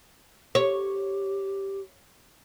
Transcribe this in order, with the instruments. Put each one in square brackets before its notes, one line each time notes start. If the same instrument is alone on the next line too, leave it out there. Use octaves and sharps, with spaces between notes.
[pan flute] G4 [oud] C#5